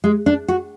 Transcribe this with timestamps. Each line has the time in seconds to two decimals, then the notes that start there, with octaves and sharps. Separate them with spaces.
0.04 G#3
0.26 D4
0.48 F#4